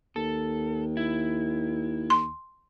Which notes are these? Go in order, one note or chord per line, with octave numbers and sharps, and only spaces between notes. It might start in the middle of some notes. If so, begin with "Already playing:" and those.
D#2 A4
E4
C6